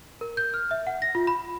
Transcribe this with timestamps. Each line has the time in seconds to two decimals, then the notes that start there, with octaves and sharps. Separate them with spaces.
0.21 A#4
0.37 G6
0.54 F6
0.71 E5
0.87 F#5
1.02 A#6
1.15 F4
1.27 B5